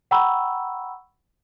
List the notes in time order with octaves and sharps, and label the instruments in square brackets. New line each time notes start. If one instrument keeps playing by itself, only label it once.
[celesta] F#5 G5 A#5 B5 C#6 E6